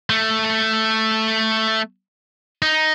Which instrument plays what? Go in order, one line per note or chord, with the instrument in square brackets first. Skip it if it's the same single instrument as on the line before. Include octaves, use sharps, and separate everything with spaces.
[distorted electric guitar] A3
D#4